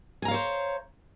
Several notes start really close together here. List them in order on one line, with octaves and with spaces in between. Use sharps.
G#5 A#5 F5 C#5 C5